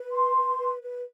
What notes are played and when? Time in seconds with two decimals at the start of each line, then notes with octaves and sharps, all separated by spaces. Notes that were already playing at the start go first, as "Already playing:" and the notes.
Already playing: B4
0.12 C6
0.36 B4
0.59 B4
0.82 B4